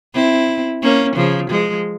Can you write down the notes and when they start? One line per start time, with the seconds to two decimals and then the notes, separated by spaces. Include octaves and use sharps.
0.14 C4 E4
0.82 A#3 C#4
1.15 C#3 F3
1.50 F3 G#3